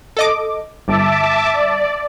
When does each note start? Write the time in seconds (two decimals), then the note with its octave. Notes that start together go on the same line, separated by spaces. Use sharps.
0.17 A4 D#5 D6
0.88 G1 E5 A5 D6
1.54 D5